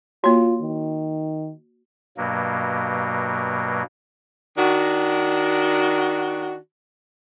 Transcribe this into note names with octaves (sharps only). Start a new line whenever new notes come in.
A#3 F4 F#4 C#5
D#3
G2 B2 F#3 A#3
D#3 D4 F#4